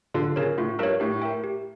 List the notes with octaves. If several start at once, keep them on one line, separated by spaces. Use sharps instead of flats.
D3 F4
C#3 A#4 C#5
A2 F4
G2 A#4 C#5
A2 G4
A#4 E5 G5
G4